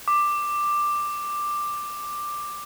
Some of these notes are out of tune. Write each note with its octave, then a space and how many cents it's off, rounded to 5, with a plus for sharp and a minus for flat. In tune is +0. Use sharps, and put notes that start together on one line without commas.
D6 +10